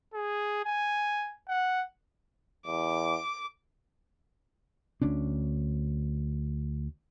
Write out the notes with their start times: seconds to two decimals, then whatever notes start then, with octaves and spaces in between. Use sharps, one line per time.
0.14 G#4
0.65 G#5
1.48 F#5
2.67 E2 D6
5.02 D2 C#4 D4